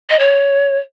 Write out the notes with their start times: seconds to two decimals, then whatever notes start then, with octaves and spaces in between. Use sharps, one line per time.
0.10 D#5
0.19 C#5